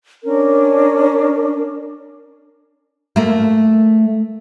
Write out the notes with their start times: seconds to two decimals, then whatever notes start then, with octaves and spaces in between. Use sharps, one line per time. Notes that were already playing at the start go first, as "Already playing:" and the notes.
0.25 C#4 D4 A#4
3.16 A3 A#3